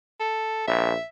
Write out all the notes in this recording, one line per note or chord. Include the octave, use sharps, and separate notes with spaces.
A4
A#1 E5